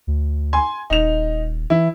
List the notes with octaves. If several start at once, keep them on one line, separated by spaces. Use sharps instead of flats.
D2
G#5 C6
D#1 D#4 F7
E3 E4